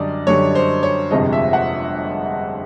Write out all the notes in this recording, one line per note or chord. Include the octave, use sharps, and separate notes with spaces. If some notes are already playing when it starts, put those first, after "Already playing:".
Already playing: F#2 D3 G3 D5 D#5
F#2 D3 G3 C#5
C5
C#5
G1 F2 C3 F3 G#3 D#5
E5
F#5